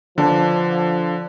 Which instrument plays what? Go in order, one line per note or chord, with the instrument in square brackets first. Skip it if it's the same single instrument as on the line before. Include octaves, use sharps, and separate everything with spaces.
[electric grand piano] D3 [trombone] F3 [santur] D4 B4 C#6